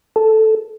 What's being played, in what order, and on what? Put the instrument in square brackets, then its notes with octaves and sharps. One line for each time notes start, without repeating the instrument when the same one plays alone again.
[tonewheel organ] A4